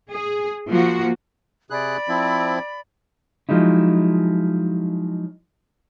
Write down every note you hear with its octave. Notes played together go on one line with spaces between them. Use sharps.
G#4
F3 A#3 F#4
C3 G#4 D5 B5 F#6
F3 C4 E4
F3 F#3 G#3 D#4 E4